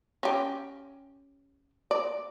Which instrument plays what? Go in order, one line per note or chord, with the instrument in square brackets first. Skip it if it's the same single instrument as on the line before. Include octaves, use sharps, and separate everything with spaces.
[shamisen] C#4 G4
D5